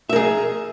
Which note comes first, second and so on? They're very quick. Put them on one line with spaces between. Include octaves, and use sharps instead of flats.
E5 A#4 G#4